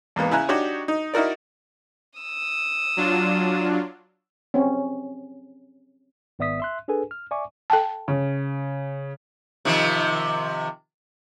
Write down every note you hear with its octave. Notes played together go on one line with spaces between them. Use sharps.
E2 G#2 A#3 B3
C#3 E4 E5 G#5 A#5 F#6
D4 D#4 F#4 G4 C#5
D#4
D#4 E4 F#4 A#4 D5
D#6 E6
F#3 D4 F4
C4 C#4
G#1 B3 D5 E5 D#6 B6
E5 C6 F#6
D4 G#4 A4 B4 G#5
F6
D5 E5 G#5 C#6 D6
A4 G5 A5
C#3
C3 D#3 F3